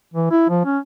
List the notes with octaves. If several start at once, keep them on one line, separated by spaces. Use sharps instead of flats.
E3
E4
F3
C#4